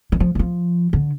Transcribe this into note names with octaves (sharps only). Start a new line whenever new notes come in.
E3
F3
E3
F3
D3